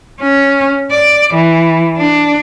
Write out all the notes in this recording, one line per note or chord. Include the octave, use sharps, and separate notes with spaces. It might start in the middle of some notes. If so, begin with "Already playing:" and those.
C#4
D5
E3
D4